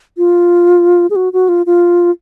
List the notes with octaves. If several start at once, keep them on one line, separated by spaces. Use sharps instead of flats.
F4
G#4
F#4
F#4
F4
F4